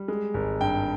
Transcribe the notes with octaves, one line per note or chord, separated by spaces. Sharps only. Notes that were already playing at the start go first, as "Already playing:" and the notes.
Already playing: G3
G#3
G#1
G2 G5